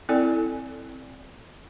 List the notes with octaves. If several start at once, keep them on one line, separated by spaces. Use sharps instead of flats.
C4 E4 A4 D5 G#5